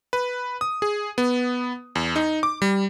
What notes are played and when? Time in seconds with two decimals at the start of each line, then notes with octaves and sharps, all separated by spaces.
0.13 B4
0.61 D#6
0.82 G#4
1.18 B3
1.95 E2
2.16 D#4
2.43 D6
2.62 G3